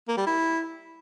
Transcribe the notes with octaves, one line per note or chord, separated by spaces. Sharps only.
A#3
G3
E4